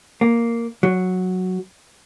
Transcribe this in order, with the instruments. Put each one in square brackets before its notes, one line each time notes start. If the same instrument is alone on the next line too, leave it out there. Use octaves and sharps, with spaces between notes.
[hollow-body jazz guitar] A#3
F#3